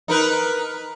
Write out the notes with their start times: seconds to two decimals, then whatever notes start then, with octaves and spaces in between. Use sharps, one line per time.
0.08 D#4 A#4 B4